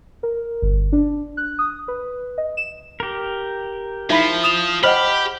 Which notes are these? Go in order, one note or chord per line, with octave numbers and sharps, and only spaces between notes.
A#4
G1
D4
F#6
D#6
B4
D#5
E7
G4 A#4
F3 D#4 E4 E5 B5 B6
D#6 E7 F7
G4 C5 D#5 F#5 B5 F6